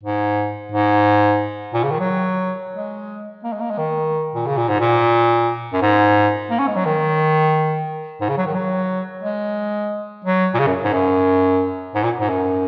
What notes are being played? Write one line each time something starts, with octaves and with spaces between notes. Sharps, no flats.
G#2
G#2
A#2
C#3
D#3
F#3
G#3
A#3
G#3
A#3
G#3
D#3
A#2
C#3
A#2
G#2
A#2
F#2
G#2
A#3
C#4
G#3
F#3
D#3
G#2
C#3
F#3
D#3
F#3
G#3
F#3
A#2
C#3
F#2
G#2
F#2
G#2
A#2
G#2
F#2